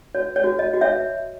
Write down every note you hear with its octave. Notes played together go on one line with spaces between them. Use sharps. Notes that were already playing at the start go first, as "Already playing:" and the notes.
F#4 C#5
C#5
F#4
D#5
F#4
C#5 E5